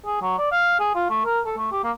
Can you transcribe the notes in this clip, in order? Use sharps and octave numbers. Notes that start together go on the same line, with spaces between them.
G#4
F#3
D5
F5
G#4
F4
A3
A#4
A4
A3
G4
A#3